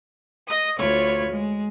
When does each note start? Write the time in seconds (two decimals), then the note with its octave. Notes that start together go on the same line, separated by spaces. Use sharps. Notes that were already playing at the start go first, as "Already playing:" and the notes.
0.47 D#5 D#6
0.78 D2 F4 C#5 B5 G#6
1.30 G#3